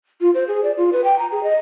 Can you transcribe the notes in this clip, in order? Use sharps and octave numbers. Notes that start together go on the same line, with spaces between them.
F4
C5
G#4
D5
F4
B4
G5
A#5
G#4
D#5